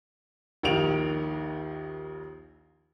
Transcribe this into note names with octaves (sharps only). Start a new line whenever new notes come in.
A#1 D#2 D#3 D7 F7